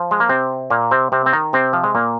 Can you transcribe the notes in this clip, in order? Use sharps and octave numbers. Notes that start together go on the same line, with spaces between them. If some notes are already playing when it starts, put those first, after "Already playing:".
Already playing: F3
G#3
A#3
C3 C4
A#2 A#3
C3 C4
C3 C4
C4
D#3 D#4
C3 C4
F3
G#3
A#2 A#3